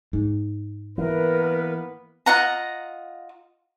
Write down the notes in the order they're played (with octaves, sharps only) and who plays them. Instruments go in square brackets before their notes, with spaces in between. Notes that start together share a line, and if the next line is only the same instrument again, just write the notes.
[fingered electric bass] G#2
[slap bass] E3 [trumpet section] A#3 B3 B4 [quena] A#4
[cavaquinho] F4 D#5 F#5 A#5